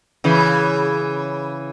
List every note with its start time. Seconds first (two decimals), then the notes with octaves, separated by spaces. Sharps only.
0.24 C#3 E3